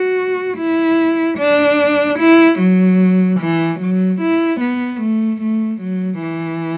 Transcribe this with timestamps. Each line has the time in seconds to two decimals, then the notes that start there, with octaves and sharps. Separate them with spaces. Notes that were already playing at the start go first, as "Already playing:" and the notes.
Already playing: F#4
0.58 E4
1.38 D4
2.19 E4
2.59 F#3
3.40 E3
3.80 F#3
4.21 E4
4.61 B3
5.01 A3
5.41 A3
5.81 F#3
6.22 E3